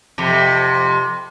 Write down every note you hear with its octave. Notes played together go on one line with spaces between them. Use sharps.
F2 C3